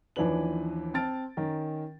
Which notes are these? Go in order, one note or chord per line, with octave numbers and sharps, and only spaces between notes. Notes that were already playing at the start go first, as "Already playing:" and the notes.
D#2 E3 F3 D4 B4 F#7
C4 A5 F6 A6 D7
D#3 C#4 A#4